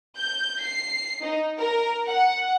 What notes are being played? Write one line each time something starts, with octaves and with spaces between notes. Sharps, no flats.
G6
C7
D#4
A#4
F#5